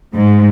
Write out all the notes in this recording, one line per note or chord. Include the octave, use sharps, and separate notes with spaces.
G#2